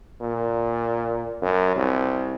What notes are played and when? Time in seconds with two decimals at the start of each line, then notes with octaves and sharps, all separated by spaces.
0.21 A#2
1.42 F#2
1.76 C2